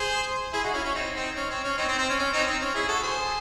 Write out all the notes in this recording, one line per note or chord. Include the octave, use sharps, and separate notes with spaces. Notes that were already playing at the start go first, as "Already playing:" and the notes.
Already playing: G#4 C5
E4 G#4
D#4 F#4
C#4 E4
C#4 E4
C4 D#4
C4 D#4
C#4
C4
C#4
C4 D#4
C4
C4
C#4
C#4
C4 D#4
C4
C#4
E4 G#4
F#4 A4
G#4 C5